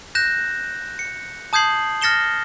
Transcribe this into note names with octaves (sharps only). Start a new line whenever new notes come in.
F#6 G6 A#6 E7
C#7
A5 D#6 G6 G#6 C7 F#7
F6 A6 A#6 C#7 E7 G7